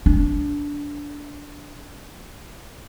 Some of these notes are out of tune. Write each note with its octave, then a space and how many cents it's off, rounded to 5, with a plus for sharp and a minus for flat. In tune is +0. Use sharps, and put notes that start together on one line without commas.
D4 -15